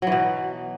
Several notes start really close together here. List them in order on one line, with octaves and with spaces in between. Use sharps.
F#3 E3 B2